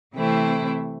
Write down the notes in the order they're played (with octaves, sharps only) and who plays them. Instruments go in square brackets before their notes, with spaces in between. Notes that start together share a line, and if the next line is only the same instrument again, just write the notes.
[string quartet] C3 E3 A3 C4 E4